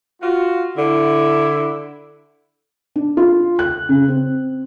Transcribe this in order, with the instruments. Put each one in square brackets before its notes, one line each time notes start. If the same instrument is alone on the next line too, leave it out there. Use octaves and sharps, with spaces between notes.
[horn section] F4 F#4
D3 E4
[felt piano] D4
F4
F#6
C#3
C4